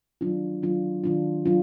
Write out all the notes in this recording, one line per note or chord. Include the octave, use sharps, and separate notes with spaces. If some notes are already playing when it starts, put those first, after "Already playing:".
D#3 F#3 D4 F4
D#3 F#3 D4 F4
D#3 F#3 D4 F4
F#3 D4 F4